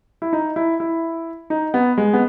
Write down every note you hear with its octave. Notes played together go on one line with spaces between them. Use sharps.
E4
D#4
E4
E4
D#4
B3
G#3
B3